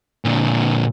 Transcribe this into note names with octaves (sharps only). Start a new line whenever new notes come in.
A#2 D3